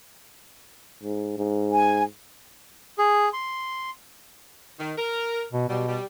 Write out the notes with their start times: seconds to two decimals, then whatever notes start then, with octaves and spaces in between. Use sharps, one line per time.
1.03 G#2
1.38 G#2
1.72 G#5
2.98 G#4
3.33 C6
4.79 D#3
4.97 A#4
5.52 B2
5.68 B2 F#3 G3
5.88 G3